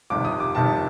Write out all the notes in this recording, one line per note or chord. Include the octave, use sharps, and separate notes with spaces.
G1 F2 C3 D#3 D6
D#6
D6
G1 F2 C3 D#3 A5